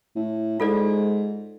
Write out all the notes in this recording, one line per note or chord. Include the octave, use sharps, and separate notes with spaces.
A2
G#2 F4 A4 D5